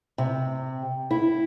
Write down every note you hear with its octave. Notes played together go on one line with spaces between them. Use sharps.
C3
E4